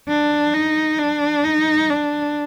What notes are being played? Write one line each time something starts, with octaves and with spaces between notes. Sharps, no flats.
D4
D#4
D4
D#4
D4